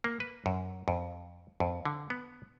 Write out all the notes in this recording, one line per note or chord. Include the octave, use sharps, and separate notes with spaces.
A#3
B4
F#2
F2
F2
D3
B3